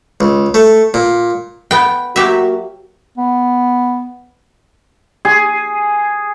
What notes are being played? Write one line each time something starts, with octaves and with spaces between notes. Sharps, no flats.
C#2
A3
A#2
B3 G5
F#3 A#3 F#4 G4 E5
B3
G#4